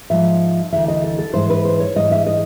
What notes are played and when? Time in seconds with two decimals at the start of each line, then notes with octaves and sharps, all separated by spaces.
0.10 G#2 F3 E5
0.72 D2 C#3 E3 E5
0.88 D#5
1.04 A4
1.18 A4
1.34 G#2 E3 C5
1.50 B4
1.65 C5
1.80 C#5
1.96 G#2 E3 D#5
2.11 E5
2.27 D#5